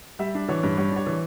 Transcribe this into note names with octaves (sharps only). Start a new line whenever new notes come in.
G3 E5
D4
E3 C#5
G2
G3 C#5
D4 C#5
E3